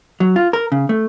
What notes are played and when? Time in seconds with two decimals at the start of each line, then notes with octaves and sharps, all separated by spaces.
0.20 F#3
0.36 F4
0.53 A#4
0.72 C#3
0.89 A3